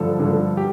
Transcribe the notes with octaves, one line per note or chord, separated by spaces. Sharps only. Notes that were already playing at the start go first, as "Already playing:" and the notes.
Already playing: G2 D3 F3 A3 A4
G2 D3 F3 A3
G4